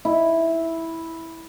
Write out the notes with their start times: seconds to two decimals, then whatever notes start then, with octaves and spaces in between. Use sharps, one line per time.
0.05 E4